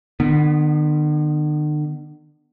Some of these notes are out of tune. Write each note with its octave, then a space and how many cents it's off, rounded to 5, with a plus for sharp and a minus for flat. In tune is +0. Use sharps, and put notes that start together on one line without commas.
D3 +45 B3 +0